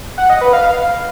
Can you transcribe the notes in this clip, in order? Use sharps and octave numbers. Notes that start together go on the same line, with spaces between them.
F#5
D#5
B4
F5